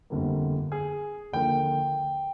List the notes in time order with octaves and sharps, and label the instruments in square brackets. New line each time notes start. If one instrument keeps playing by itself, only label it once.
[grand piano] G1 F2 D3 G3 A#3
G#4
D#2 D3 F3 A#3 G5